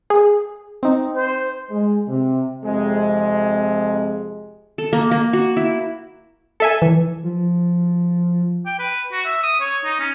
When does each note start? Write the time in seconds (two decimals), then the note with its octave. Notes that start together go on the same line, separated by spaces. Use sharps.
0.10 G#4
0.83 C4 D#4
1.16 C5
1.71 G#3
2.08 C3
2.64 F2 C3 G#3
4.78 A4
4.93 A#3
5.11 A#3
5.33 F#4
5.57 E4
6.60 A4 E5 G#5
6.82 E3
7.23 F3
8.66 G5
8.79 B4
9.12 F#4
9.25 E5
9.43 D#6
9.60 C#5
9.85 D#4
10.00 C#4